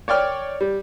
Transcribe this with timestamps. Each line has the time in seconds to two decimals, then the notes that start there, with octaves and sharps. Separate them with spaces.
0.08 C#5 D5 G5 F6
0.61 G3